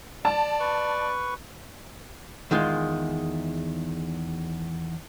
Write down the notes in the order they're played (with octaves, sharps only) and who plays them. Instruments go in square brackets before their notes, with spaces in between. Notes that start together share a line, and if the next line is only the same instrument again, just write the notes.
[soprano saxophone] D5 [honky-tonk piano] A5
[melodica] B4 C#6
[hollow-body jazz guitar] E2 D#3 G#3 F4